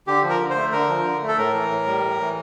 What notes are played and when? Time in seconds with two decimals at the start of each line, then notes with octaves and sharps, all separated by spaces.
0.07 D3 G4
0.23 F3
0.30 A#4
0.40 D3
0.50 C5
0.56 A3
0.72 D3 A#4
0.89 F3
1.05 D3
1.22 A3
1.28 A4
1.38 A2 A#4
1.54 E3
1.71 A2
1.87 G3
2.04 A2
2.20 E3